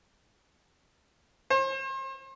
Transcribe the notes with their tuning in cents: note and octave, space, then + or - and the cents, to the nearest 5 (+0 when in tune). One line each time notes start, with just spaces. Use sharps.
C5 +40